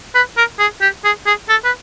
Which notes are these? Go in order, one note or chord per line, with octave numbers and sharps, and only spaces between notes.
B4
A#4
G#4
G4
G#4
G#4
A4
B4